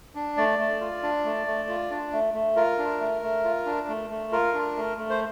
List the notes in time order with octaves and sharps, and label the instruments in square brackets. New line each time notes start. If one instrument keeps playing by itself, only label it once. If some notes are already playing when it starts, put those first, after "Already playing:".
[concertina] D4
A3 D5
A3
F4
D4
A3
A3
F4
D4
A3
A3
F4 A#4
D4
A3
A3
F4
D4
A3
A3
F4 A#4
D4
A3
A3
C5